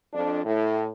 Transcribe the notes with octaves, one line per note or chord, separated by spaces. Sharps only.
F2 D4
A2